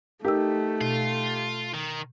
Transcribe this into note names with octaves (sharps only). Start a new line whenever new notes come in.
A3 D#4 G4 A#4 E6
B2 F4
D#3